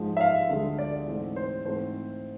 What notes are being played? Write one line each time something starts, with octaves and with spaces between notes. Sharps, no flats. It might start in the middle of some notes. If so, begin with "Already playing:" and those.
Already playing: G#2 F3 G#3
E5
F5
D2 D3 G#3
D5
G#2 E3 A3 C4
C5
G#2 E3 A3 C4 C5